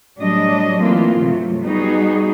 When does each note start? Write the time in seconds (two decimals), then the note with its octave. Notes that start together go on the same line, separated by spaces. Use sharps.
0.18 A2 F#3 G3 D4 D#5
0.80 E3 A3 A#3 C4 F4
1.18 G2 C3 F#3 A3
1.61 G3 B3 D#4 F#4 G#4